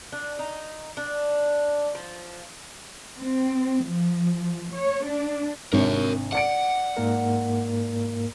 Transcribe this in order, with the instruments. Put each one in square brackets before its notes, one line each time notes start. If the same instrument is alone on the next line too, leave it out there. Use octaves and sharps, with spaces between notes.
[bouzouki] D4
D#4
D4
F3
[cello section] C4
F3
C#5
D4
[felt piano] G#1 C3 D4 [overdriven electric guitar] A#4 C#5
[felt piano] D5 C#7 D7 [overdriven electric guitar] F#5
[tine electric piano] G#2 A#3 A#4